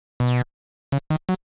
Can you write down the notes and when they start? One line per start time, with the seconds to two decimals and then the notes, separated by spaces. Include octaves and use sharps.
0.20 B2
0.92 C#3
1.10 D#3
1.29 F#3